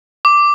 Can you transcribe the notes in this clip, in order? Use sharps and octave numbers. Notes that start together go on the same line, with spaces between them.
D6